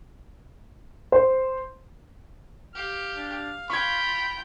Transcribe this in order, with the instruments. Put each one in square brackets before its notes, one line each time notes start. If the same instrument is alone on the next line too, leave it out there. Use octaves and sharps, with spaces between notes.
[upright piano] C5
[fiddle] G4 [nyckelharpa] F5
[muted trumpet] D4
[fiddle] F4 G5 [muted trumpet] B5 [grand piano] C#6 G#6